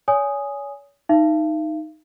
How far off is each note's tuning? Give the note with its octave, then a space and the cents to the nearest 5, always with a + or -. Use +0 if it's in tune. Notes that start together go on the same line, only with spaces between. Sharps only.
C#5 +35 G#5 +0 D#6 +0
D#4 +0 F5 -45